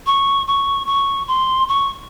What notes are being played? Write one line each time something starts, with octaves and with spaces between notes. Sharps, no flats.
C#6
C#6
C#6
C6
C#6